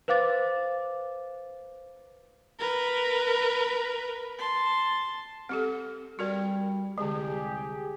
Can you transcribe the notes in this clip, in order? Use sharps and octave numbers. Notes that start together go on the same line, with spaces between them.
B4 C5 F5 D6 A6
A#4 B4
A5 C6
C4 G4 A4
G3 F#4 A#4 D5
C2 D3 G#3 G4 G#4